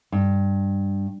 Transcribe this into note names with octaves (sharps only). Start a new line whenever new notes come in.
G2